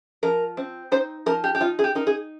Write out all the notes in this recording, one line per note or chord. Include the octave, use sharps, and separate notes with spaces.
F3 A#4
C4
D#4 C5
F3 A#4
G4
G4
D#4 F4
G#4
G4
D#4 A#4
G#4